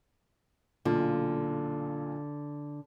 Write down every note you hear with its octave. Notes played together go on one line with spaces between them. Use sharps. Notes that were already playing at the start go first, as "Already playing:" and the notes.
B1 A#2 D3 F4